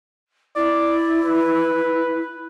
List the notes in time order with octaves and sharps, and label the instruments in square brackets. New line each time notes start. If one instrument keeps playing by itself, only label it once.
[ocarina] E4 [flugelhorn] D5
[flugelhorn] B4